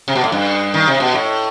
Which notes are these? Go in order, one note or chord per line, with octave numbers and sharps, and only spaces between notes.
C3
B2
A2
G2
D#3
C3
B2
A2